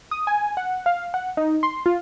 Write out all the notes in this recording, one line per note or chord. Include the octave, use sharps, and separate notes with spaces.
D#6
G#5
F#5
F5
F#5
D#4
C6
F4